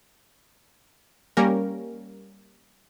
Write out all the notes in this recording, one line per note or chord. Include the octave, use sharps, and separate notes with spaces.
G3 A#3 C#4 A#4